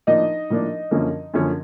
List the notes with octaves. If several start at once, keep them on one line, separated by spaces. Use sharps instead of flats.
A2 F3 A#3 D4 D#4 D#5
A2 F3 A#3 D4
F#2 D3 F3 A#3 C#4
F#2 D3 F3 A#3 C#4